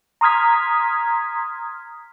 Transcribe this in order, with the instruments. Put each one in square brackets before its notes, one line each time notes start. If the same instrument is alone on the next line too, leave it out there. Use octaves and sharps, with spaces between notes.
[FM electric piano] A#5 C6 D#6 F6 G#6 B6